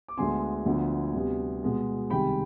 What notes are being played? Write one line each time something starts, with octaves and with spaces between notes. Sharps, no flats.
D6
D2 D3 G#3 B3 G#5 C6
D2 D3 F3 B3
D2 C3 G3 B3
B2 G#3 B3
C2 C3 D#3 G#3 G5 B5